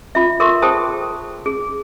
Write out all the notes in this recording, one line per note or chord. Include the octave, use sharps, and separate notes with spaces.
F4 E5
A4 A#4 E5 C6 C#6
G#4 C5 G5 A5 D#6
G#4